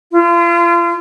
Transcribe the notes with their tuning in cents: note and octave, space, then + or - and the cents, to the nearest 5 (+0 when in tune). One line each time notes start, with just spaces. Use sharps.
F4 -35